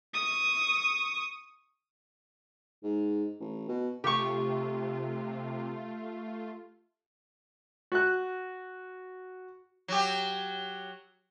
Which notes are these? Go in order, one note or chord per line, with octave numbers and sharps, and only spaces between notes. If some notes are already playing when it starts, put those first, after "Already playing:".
C#6 D#6
G#2
A1
B2
C3 A3 F4 G4 C#6
F#4 F#6
F#3 G4